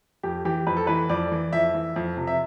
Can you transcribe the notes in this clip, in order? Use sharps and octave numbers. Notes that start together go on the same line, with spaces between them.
F2 G4
E3 G4
F2 B4
A4
E3 B4
F2 D5
E3
F2 E5
E3
F2
C3 F3
E5